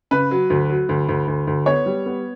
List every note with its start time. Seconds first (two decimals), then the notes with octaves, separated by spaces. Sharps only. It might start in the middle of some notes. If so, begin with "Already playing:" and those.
0.11 C#3 B4
0.31 F#3
0.50 D2
0.70 F#3
0.89 D2
1.09 D2
1.28 D2
1.47 D2
1.66 B3 C#5
1.86 G3
2.06 B3